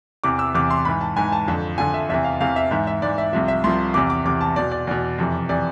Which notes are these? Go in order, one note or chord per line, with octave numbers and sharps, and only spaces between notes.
E2 C3 E3 D6
E6
E2 C3 E3 D6
C6
G#2 E3 B5
A5
G#2 E3 G#5
A5
F2 D3 F3
F2 D3 F3 G#5
E5
E2 C3 E3 E5
F5
E2 C3 E3 F5
E5
G#2 E3 E5
E5
G#2 E3 D5
E5
C2 C3 F3 E5
E5
C2 C3 F3 C6
E2 C3 E3 D6
D6
E2 C3 E3 D6
A5
E2 B2 D5
D5
E2 B2
F2 C3 E3
C3 E3 D5